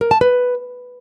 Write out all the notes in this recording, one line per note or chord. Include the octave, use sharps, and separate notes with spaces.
A#4
A5
B4